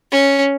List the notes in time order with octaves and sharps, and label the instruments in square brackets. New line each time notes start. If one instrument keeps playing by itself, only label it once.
[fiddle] C#4